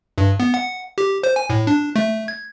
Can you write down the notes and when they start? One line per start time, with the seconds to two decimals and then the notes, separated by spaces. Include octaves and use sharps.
0.18 G2
0.40 B3
0.54 F#5
0.98 G4
1.23 C5
1.36 G#5
1.50 A2
1.67 D4
1.96 A3
2.28 G#6